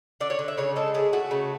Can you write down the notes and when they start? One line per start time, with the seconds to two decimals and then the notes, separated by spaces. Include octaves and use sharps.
0.20 D3 D5
0.30 C#5
0.39 D3
0.48 E5
0.58 C#3 C#5
0.76 G#3 A4
0.94 A3 G#4
1.13 A3 F#4
1.31 C#3